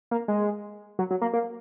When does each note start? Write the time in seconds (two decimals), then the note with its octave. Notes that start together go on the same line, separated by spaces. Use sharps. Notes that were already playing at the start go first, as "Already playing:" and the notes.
0.11 A#3
0.28 G#3
0.99 F#3
1.11 F#3
1.22 A#3
1.33 A#3